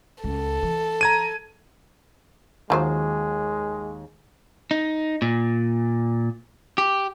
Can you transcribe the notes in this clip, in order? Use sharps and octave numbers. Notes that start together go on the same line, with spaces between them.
C#2 A4
E3
A#5 G#6 D#7
D#2 F3 F#3 G#3 C5
D#4
A#2
G4